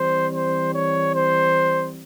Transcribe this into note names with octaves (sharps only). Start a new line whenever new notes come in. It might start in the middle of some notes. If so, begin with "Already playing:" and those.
Already playing: E3 G3 C4 C5
C5
C#5
C5